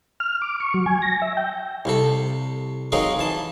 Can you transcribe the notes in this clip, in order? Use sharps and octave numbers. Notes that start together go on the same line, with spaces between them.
F6
D6
C#6
F#3
G#5
A#6
E5
G5
C2 C3 A4
F#3 G#3 C4 D#4 A#4 F5
E3 A5